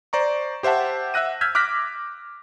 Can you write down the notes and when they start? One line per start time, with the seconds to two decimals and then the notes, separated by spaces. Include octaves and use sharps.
0.13 C5 D5 A#5 C#6
0.63 G4 C5 E5 F#5 A5
1.14 E5 F#5 E6 F#6 A#6 D#7
1.41 E6 F6 G6 G#6 B6
1.55 D6 F6 F#6 A#6 B6